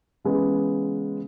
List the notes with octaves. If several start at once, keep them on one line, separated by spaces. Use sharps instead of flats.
C#3 E3 G#3 B3